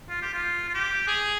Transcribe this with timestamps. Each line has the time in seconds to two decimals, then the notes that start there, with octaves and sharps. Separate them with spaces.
0.09 F4
0.22 G4
0.34 F4
0.68 F4
0.75 G4
1.08 G#4